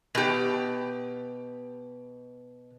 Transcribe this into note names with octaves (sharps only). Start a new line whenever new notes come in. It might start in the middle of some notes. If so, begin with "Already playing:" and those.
B2 G4